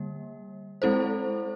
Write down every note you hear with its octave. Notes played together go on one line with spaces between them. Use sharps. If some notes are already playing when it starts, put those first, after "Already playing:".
Already playing: D3 G3 A#3
G#3 C4 E4 A4 C5